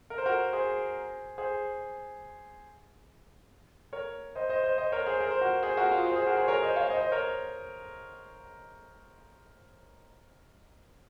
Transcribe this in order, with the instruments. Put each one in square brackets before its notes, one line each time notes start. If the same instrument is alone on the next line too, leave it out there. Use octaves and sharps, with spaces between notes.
[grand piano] A#4
C5
F#4 A#4
G#4 C5
G#4 C5
A#4 C#5
C5 D#5
C5 D#5
C5 D#5
C5 D#5
A#4 C#5
G#4 C5
A#4
C5
F#4 A#4
G#4 C5
F#4 A#4
F4 G#4
G#4 C5
G#4 C5
F#4 A#4
G#4 C5
A#4 C#5
C5 D#5
C#5 F5
C5 D#5
C5 D#5
A#4 C#5